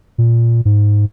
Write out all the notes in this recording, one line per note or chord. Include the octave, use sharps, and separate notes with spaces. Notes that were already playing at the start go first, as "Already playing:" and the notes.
A#2
G#2